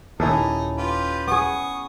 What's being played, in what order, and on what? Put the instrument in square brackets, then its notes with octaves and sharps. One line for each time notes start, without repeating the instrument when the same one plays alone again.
[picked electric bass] D#1 D#2 [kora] C#4 E4 A4 [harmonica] D#4
[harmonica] F4 G4 B4
[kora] B3 G#4 [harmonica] C#6 D#6